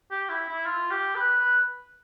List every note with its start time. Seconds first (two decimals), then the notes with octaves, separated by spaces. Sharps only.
0.11 G4
0.29 E4
0.48 E4
0.66 F4
0.90 G4
1.15 B4
1.39 B4